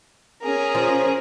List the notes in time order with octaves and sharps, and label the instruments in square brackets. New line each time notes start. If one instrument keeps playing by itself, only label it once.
[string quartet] C#4 G#4 A#4
[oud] F3